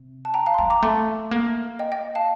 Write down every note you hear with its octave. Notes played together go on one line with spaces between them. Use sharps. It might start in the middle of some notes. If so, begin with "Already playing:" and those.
Already playing: C3
A5
G5 A#5
F5 A5
C6
G3 G5 A#5
A#5 D6
A3 A5 C6
A#3
D#5 G5
D#5 G5
F5 A5